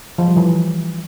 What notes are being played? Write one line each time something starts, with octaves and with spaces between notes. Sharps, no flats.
F3
G3
E3